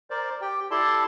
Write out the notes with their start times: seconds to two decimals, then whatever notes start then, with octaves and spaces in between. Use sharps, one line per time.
0.10 A#4 C5 D5
0.41 G4 G5
0.71 E4 G4 A4 D5 A5 C6